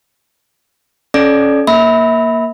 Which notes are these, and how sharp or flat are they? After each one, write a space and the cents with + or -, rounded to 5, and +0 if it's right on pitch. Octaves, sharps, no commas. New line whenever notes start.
C#4 +0 A4 -30 D5 +15
A#3 +0 E5 -25 B5 +0